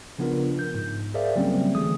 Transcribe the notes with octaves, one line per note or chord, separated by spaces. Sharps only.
C#3 F3 B3 D4 F4 A#4
G6
G#2
G#4 A#4 C5 D5 E5 F5
C#3 F#3 G3 A#3 C4 C#4
D3 E3 A3 G#4 D#6